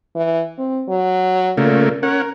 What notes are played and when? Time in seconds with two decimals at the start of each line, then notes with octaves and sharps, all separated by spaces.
0.15 E3
0.58 C4
0.88 F#3
1.58 A#2 C#3 A3 A#3
2.03 C#4 A#4 F#5